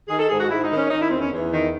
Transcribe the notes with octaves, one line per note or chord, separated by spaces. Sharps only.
D#3 G#4
A4
G#2 G#4
F#4
G#2 E4
D#4
D#3
C#4
D#3 D#4
E4
E2 C4
C#4
E2
D#3